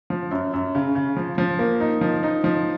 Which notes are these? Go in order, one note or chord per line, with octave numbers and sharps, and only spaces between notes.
F3
F#2
F#2
C#3
C#3
F3
F3
A#3
D#4
F3
D#4
F3